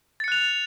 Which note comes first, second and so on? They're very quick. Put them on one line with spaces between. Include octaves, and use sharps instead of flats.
A6 C#7 F#6 F7